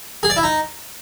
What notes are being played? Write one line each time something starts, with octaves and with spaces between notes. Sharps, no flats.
G#4
D5
E4
D#4